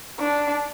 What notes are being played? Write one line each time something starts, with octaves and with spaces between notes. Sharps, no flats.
D4